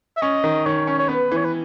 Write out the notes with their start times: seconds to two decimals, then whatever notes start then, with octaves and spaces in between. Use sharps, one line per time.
0.17 E5
0.22 C#4 D#5
0.44 D#3
0.66 D#3 C#5
0.87 C#4
0.99 C#5
1.09 B3 B4
1.31 E3
1.37 C#5
1.45 B4